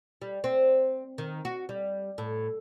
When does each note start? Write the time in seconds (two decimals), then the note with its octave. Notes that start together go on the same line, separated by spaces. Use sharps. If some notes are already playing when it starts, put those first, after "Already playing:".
0.22 G3
0.44 C4
1.18 D#3
1.45 F#4
1.69 G3
2.18 A2